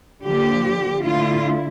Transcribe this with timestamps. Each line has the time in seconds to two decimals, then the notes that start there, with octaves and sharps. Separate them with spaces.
0.24 D3 F3 A#3 G4
1.04 D3 A3 E4 F4